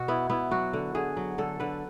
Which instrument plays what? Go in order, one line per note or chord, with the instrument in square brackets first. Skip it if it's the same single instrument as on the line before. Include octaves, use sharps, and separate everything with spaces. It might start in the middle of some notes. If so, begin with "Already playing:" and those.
Already playing: [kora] B2 F#4
B3 E4
B3 E4
F#3 F#4
D3
D3 G#4
F#3
D3 A4
D3 B4